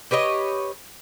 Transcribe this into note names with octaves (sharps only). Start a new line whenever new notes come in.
G4 B4 C#5 D#5